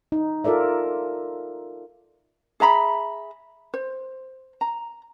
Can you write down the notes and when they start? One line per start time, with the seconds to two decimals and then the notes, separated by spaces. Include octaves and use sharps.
0.12 D#4
0.44 F4 A4 A#4 D5 E5
2.60 G#4 E5 A#5 B5
3.74 C5
4.61 A#5